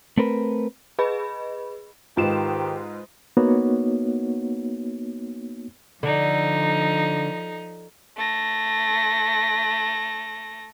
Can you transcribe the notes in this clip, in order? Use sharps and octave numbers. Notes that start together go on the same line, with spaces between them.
A3 C4 A#4 B4
G#4 B4 D#5 B5
G#2 D#3 F4 G4 B4 E7
A#3 B3 D#4 F#4 C#5
D3 F3 D#4
A3 A#6